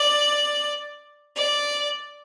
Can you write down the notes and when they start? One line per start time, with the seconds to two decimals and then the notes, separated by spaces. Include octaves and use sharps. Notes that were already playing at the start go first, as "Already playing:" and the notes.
Already playing: D5
1.36 D5